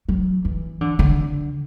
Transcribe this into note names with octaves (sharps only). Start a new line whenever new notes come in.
F#3
E3
D3
D3